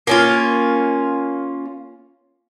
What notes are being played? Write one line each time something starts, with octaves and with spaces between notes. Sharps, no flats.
A#3 C#4 F4